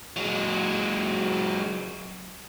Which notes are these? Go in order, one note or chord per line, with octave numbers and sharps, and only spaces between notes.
F#3 G#3